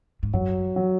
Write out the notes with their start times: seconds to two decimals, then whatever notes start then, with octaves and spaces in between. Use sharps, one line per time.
0.23 G#2
0.33 F#2 F#3
0.76 F#3